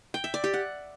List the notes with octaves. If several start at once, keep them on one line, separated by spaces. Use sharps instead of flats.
G5
E5
D5
G4
F#5